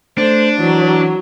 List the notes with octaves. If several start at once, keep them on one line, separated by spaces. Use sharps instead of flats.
A3 D4 C5
E3 F#3